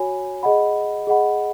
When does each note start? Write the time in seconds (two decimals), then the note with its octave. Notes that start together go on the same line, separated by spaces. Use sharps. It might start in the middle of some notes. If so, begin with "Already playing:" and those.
Already playing: F#4 C#5 G#5 B5
0.43 G#4 D#5 F#5 B5
1.07 G#4 D#5 F#5 B5